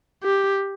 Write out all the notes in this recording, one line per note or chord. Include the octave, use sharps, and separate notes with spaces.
G4